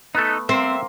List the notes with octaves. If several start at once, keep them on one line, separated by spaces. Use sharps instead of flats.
A3 B3 D#4 A4
A#3 C4 E5 C6